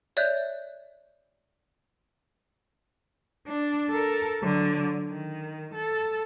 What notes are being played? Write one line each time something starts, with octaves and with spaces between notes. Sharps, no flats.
C#5 D5 E5 F#6 G6
D4
A4 A#4
D3 F#3
D#3
A4